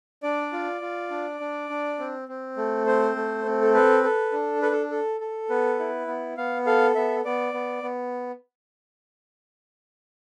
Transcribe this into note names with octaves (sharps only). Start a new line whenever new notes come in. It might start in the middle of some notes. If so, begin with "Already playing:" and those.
D4 D5
F4
F4
D4
D4
D4
C4
C4
A3
C4 C5
A3
C4
A4
A4 B4
A4
D4
A4 B4
A4
A4
A4
B3 B4
E4
B3
B3 F5
A4 F5
B3 E5
B3 D5
B3
B3